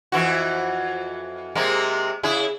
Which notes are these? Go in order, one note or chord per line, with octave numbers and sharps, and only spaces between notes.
F2 E3 F#4
C3 G#3 A#3
C#3 E4 G#4